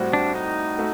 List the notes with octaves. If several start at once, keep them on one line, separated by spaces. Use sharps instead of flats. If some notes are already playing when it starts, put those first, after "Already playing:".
Already playing: A2 G3 C4 F#4
D4
D#4
A3 F#4